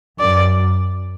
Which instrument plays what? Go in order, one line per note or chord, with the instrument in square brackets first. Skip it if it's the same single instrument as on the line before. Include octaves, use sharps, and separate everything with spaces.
[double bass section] F#2 [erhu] D5